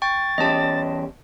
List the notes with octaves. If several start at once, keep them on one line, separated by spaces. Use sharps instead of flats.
G5 C#6 A6
E2 C#4 G4 D#5 A5